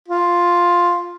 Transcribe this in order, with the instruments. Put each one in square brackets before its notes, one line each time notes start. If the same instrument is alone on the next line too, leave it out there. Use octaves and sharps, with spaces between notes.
[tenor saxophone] F4